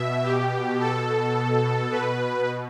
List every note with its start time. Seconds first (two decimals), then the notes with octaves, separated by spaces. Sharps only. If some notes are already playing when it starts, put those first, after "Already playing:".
Already playing: B2 E5
0.23 G4
0.80 A4
1.91 B2 B4